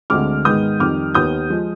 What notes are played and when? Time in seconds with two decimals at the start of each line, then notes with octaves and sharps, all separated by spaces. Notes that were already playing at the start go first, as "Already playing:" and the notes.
0.10 D2 D3 G#3 C4 D6 F6
0.45 G#2 D#3 G#3 B3 D#6 G6
0.80 F2 D#3 G3 D6 F6
1.14 D#2 D#3 B3 D#6 G6
1.50 F3 G#3